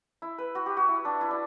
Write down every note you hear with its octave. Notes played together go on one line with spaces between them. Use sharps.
E4
B4
F#4
G4
F#4
E4
D4
E4
D4